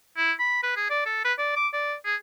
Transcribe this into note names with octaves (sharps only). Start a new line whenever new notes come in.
E4
B5
B4
G#4
D5
A4
B4
D5
D6
D5
G#4